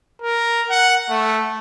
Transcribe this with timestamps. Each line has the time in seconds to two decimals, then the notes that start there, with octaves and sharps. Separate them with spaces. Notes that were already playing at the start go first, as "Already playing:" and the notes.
0.22 A#4
0.70 F#5
1.10 A3